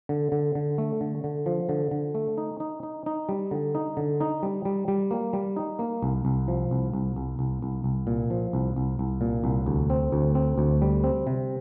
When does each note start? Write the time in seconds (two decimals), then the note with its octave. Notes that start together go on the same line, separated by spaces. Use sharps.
0.09 D3
0.32 D3
0.55 D3
0.78 A3
1.01 D3
1.24 D3
1.46 F3
1.69 D3
1.91 D3
2.15 A3
2.38 D#4
2.60 D#4
2.83 D#4
3.06 D#4
3.29 G3
3.51 D3
3.75 D#4
3.97 D3
4.21 D#4
4.43 G3
4.65 G3
4.88 G3
5.11 A#3
5.33 G3
5.56 D#4
5.79 A#3
6.03 C2
6.25 C2
6.48 F3
6.71 C2
6.93 C2
7.16 C2
7.39 C2
7.62 C2
7.84 C2
8.07 A#2
8.30 F3
8.53 C2
8.76 C2
8.99 C2
9.21 A#2
9.44 C2
9.66 D2
9.90 C4
10.12 D2
10.35 C4
10.58 D2
10.82 G3
11.04 C4
11.27 C3